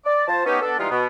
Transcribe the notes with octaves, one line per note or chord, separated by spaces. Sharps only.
D5
F3 C5 A5
B3 C#4 D#4 G4
B3 D4 A4
E3 G3 G#3 D#4 F4
B2 B3